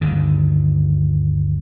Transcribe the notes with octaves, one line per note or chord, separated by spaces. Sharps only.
G1 D2 D#3